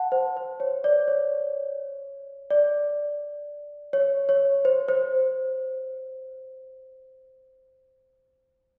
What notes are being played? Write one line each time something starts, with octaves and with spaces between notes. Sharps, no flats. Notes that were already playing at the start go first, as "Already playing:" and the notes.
Already playing: F#5 A5
C5
C5
C#5
D5
C#5
D5
C#5
C#5
C5
C5